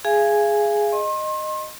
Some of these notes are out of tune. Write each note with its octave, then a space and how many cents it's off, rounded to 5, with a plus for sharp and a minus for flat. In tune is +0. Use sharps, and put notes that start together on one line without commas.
G#4 +0 F5 -35 G#5 +0
D#5 -15 C6 +35